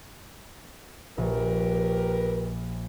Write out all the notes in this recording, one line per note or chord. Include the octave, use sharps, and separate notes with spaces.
A#1 G4 A#4 B4